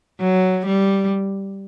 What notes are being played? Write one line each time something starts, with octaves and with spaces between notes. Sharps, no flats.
F#3
G3